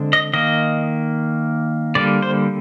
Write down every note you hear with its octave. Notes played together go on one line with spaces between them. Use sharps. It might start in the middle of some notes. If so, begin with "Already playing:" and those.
Already playing: D3 G#3 C4
D#5
D#3 A#3 D#5
D3 G3 A#3 D5
C5